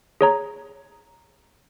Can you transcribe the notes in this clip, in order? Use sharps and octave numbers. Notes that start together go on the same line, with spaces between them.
G#4 C#5 A#5